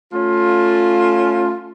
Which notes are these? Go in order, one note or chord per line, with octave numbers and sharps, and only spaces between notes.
A3 C#4 F4